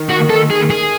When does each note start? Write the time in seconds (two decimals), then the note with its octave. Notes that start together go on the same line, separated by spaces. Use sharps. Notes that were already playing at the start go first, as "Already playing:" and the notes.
Already playing: D#3
0.10 F#4
0.30 A4
0.51 G#4
0.71 G#4